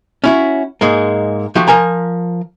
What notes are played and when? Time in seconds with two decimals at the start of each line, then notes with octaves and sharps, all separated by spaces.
0.24 C#4 E4 F#4
0.81 G#2 G#3 A#3
1.55 F3 A3 F#4 G4
1.68 F3 A#4 G#5 A#5